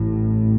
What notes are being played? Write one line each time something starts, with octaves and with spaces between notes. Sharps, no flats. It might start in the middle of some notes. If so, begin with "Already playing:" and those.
Already playing: A1 A2